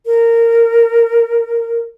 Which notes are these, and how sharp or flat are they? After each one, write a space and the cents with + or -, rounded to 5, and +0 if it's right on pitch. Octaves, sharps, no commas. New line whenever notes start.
A#4 -15